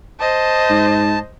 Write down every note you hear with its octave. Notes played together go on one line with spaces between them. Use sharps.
C5 D#5 A5
G#2